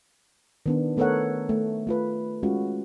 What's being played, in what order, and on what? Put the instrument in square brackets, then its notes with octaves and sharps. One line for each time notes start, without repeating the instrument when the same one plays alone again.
[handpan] D#3 B3 D4
A3 B3 A4 A#4 C#5 F#5
A3
A3 F4 B4
G#3 C#4 F4 F#4